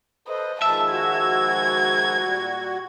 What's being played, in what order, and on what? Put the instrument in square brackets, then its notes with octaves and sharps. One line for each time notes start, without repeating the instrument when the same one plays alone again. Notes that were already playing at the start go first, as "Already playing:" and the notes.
[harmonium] A4 B4 C5 [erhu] D#5
[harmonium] D#3 F3 G#3 [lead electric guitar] E5 [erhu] A5
[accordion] F#4 [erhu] G#6
[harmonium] A#2 G3